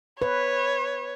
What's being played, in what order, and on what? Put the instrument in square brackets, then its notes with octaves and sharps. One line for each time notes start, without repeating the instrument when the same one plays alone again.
[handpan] B4 [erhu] C#5